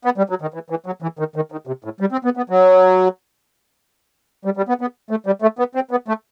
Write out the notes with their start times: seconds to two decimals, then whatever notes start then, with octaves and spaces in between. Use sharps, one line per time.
0.05 B3
0.18 G3
0.30 F#3
0.42 D#3
0.54 E3
0.70 E3
0.86 F#3
1.02 E3
1.19 D#3
1.36 D#3
1.52 D#3
1.67 C3
1.84 A2
2.00 G3
2.12 C4
2.25 B3
2.37 B3
2.50 F#3
4.45 G3
4.57 G3
4.69 B3
4.81 B3
5.11 A3
5.26 G3
5.42 A3
5.59 B3
5.75 C4
5.91 B3
6.08 A3